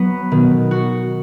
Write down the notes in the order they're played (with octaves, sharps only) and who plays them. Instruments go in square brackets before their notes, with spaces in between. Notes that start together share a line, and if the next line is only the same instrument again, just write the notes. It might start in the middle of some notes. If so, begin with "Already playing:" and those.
Already playing: [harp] F#3 B3
[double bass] B2 [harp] D#3
[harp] F#4